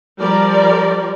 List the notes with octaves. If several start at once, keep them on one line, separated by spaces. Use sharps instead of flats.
F3 G3 A#4 D5